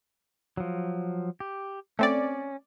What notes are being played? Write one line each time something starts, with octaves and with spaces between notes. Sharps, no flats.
F3 F#3
G4
A3 C4 C#4 D5